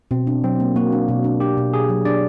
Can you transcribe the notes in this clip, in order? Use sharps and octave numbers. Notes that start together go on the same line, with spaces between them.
B2 C4
D4
F#3 C4
A#3
A#3 F#4
D4
B2
D4
D4 G4
B2
B2 G#4
F#3
D4 D5